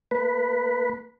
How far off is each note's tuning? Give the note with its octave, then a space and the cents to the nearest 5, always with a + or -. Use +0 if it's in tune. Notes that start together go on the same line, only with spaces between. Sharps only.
A#3 -40 B4 +0